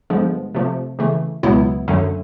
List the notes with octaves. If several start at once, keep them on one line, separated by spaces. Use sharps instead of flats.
G2 D3 F3 G#3 B3
C3 F3 A3
C#3 E3 A3
C#2 B2 F#3 B3 E4
F#2 D3 F#3 A3